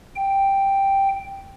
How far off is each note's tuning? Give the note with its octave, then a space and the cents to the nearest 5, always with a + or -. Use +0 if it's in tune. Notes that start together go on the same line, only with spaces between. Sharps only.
G5 +0